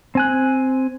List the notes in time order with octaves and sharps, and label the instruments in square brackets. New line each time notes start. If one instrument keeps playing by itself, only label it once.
[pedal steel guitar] C4 G#5 F#6